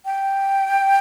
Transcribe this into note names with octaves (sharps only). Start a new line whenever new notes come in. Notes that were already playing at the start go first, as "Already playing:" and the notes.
G5